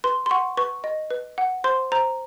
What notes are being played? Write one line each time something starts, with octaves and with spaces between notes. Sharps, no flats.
B4 C6
C6
F#5 C#6
B4 C#6
D#5
B4
F#5
C5 C6
C5 A#5